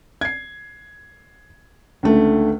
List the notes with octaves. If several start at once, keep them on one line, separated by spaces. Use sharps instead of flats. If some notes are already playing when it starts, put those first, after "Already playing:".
G#6 C7
C#2 D3 A3